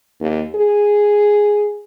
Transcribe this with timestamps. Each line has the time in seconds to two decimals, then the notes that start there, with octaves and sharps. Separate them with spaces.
0.20 D#2
0.56 G#4